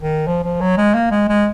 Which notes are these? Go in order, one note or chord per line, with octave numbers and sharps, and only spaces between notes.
D#3
F3
F3
F#3
G#3
A#3
G#3
G#3